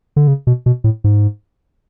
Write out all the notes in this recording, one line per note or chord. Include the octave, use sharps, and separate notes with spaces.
D3
C#3
B2
B2
A2
G#2